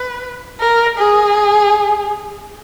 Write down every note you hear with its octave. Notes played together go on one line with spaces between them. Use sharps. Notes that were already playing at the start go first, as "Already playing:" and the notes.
Already playing: B4
A#4
G#4